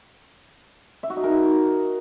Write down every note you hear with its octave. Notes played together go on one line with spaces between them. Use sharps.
E5
F#4
D#4
A#4
D#4